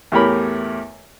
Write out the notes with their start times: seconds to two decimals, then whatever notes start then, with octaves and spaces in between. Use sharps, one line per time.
0.12 E2 A2 G4 A#4 C#5 B5